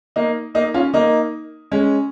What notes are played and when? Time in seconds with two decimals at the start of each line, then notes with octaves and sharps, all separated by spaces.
0.16 A#3 D#4
0.55 A#3 D#4
0.74 C#4 F4
0.93 A#3 D#4
1.71 G#3 C#4